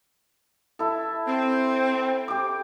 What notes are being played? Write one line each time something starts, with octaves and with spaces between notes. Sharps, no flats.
E4 A4
C4
G4 D6